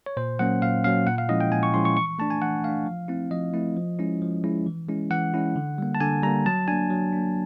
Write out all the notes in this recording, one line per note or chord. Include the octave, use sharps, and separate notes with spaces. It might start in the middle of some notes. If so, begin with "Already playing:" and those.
C#5
A#2 C5
F#3 A#3 C#4 F#5
A#2 F5
F#3 A#3 C#4 F5
A#2 F#5
F5
F3 G#3 C#4 E4 D#5
G5
A#2 G#5
C#6
F3 G#3 C#4 E4 C6
C#6
E3 C#6
A3 D4 A5
G#5
E3 F#5
A3 D4 F5
F3
A3 C4 E4
F3 D#5
A3 C4 E4
F3
G#3 C#4 E4
F3
G#3 C#4 E4
E3
G#3 C#4 E4
E3 F#5
G#3 C#4 E4
D3
G3 A#3
A5
D3 G#5
G3 A#3 A#5
F#3 A5
A#3 D4 G#5
F#3
A#3 D4